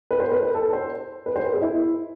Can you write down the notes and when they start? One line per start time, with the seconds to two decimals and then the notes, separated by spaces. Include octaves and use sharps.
0.11 B4
0.20 C5
0.32 B4
0.43 B4
0.55 A4
0.73 C5
1.26 B4
1.36 C5
1.44 B4
1.53 G#4
1.61 E4